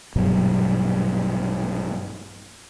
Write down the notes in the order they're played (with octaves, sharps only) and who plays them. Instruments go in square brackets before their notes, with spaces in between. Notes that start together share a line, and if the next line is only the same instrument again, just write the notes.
[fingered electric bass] A#1 G2 B2 F#3